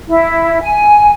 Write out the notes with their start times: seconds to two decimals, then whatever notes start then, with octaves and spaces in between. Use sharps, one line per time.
0.08 E4
0.62 G#5